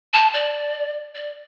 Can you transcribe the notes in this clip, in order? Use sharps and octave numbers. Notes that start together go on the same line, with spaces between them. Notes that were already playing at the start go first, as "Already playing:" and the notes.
A5
D5
D5